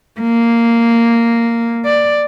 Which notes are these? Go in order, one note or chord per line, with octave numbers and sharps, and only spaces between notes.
A#3
D5